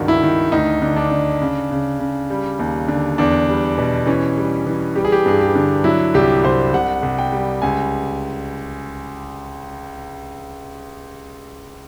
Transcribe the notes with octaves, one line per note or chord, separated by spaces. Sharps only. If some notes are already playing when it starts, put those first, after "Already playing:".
Already playing: C#2 G2 D#3 F#4
E4
D#3
D2 D#4
D3
D4
D3
C#3
C#3
C#3
G3
D#2
D3
E2 D4
G3
B2
E3 C#4
G3
E3
G3 G4
G#4
G4
G2 G#4
G4
D3
F#3 E4
C2 G4
C2 C5
C2 F#5
C2
G5
G3
C#2 G#5